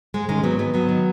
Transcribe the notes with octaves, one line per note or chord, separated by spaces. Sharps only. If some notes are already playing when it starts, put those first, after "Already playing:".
G#2 G#3
D#3 G#3 C#4
G#2 F#3 B3
D#3 F#3 B3
G#2 F#3 B3
D#3